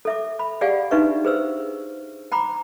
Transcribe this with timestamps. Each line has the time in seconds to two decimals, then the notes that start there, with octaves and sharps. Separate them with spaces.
0.05 A4 E5 D6
0.39 B5
0.61 G4 G#4 D5 F5 F#5 G#5
0.91 D4 D#4 F#4 B4 E5 C#6
1.25 G#4 B4 C5 E6
2.32 G5 A#5 B5 D6